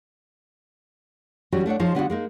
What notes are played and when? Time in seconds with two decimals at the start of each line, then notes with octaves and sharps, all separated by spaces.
1.52 E3 F#3 G3 C#4 F#4
1.66 A3 D4 C#5 F#5
1.79 F3 D#4 G#4 C5 C#5
1.95 D3 G3 B3 D4 F4 F#4
2.10 G#3 A#3 D#4